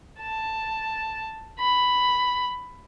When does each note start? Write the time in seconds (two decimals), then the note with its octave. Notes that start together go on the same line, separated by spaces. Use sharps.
0.20 A5
1.59 B5